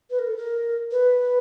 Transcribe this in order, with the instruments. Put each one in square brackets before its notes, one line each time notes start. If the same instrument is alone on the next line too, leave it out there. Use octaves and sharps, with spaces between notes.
[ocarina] B4
A#4
A4
A#4
B4